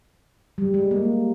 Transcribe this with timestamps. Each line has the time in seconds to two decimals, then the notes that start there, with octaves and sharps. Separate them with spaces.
0.58 G3
0.74 G#3
0.91 A#3